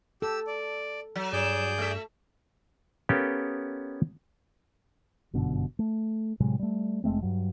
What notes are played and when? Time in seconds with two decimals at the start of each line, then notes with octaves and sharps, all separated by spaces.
0.22 G4 A4 E6
0.47 D5
1.16 F#3
1.33 G2 G#4 D5 G6
1.78 A3 E5
3.09 B3 C#4 G4 A4 A#4 F5
5.33 G1 F#2 B2 D3
5.79 A3
6.40 A2 C3 F#3 G#3
6.59 G3 A3
7.04 F1 G#3 A3 C4
7.22 G2 F#3